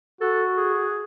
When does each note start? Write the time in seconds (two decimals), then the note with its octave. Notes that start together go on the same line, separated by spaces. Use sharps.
0.21 F#4 A4
0.57 G#4